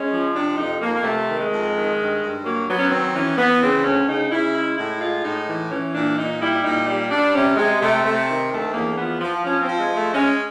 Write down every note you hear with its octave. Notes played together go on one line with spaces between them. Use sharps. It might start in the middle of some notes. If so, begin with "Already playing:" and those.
Already playing: G#3 C#4
F3
C3 D4
F2 D#4
F2 A#3
A#3
C3 A3
D#3
G#3
F2
D#3
G2
G2
F#3 A#3
F#3 B3
C#4
D#3 C4
E3 C#4
E3 B3
C#3 C4
D2 C#4
C#3 D#4
C#3 E4
G#3 E4
A2 E4
G#3 F4
A2 D#4
E3
E3 C#4
A#2 D4
A#2 D#4
G3 E4
A#2 D#4
G3
G3 D4
C3 C#4
C3 G#3
C3 A3
C3 A3
D#3
D2 A3
E2 A#3
F3 B3
F3
F3 C#4
C4
F3
G#3
G#3
A3
G#3 C#4